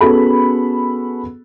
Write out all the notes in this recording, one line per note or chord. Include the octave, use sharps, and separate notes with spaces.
B3 C#4 F#4 G#4 A4 B5